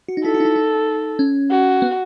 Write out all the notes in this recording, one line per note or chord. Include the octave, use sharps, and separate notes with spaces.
F#4
D#4
E4 A4
F#4
D#4
E4
D#4
C#4
F#4
B3